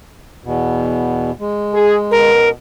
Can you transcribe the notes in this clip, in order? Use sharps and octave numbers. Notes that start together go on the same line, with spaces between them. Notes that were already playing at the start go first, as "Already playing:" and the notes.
E2 B2
G#3
G#4
C#2 B2 A#4